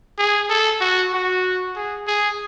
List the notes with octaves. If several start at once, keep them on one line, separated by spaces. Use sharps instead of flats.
G#4
A4
F#4
F#4
G#4
G#4